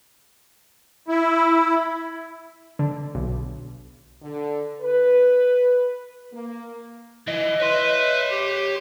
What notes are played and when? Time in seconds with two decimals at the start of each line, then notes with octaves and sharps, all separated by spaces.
1.08 E4
2.79 D3
3.15 B1
4.22 D3
4.81 B4
6.33 A#3
7.28 E3 D#5
7.60 B4 C#5 E5 C6
8.30 G4